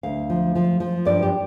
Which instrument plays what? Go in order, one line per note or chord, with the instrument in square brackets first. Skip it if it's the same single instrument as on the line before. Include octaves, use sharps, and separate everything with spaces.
[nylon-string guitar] D2 F5
F3
F3
F3
G2 D5
G4